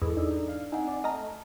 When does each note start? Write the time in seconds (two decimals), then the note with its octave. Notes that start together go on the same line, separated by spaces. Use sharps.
0.02 E2 G#2 G#4 A4
0.16 D4 D#4 D5 E6
0.48 F5
0.72 C4 D#4 F#5 G#5
0.87 D5
1.04 A3 D#5 A5 A#5 F6